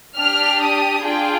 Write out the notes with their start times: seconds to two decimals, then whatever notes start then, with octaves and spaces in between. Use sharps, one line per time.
0.17 D4 G4 F6
0.61 D#6
1.04 D4 F4 G#4 G5